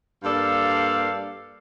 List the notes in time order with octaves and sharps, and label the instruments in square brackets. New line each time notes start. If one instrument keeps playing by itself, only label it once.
[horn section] G2 A#3 A4 D5 F5